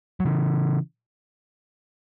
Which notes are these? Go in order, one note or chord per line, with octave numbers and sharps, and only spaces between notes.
F#3
C#3 E3